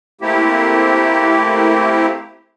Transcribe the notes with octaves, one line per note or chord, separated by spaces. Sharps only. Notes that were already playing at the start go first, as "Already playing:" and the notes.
A3 A#3 C4 E4 G4